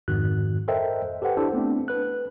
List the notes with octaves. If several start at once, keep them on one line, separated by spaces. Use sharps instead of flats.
F2 G#2 D#3 F#4 F#6
A4 A#4 C5 D#5 E5 G5
G4 A4 B4 C5 F#5 G5
D4 E4 G4 A4 C5
A3 B3 C4 D4
B4 F#6